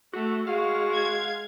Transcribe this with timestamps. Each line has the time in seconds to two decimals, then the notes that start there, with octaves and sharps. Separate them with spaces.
0.13 A3 F#4
0.47 G#3 F#4 F5
0.95 G#6